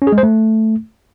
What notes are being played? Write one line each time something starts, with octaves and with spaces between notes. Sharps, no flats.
C#4
G#4
G#3
C5
A3